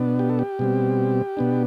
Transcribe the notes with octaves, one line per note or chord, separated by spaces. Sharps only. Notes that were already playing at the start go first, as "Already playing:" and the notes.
Already playing: B2 B3 D4
G4
A4
G4
B2 G3 C4
B2 B3 D4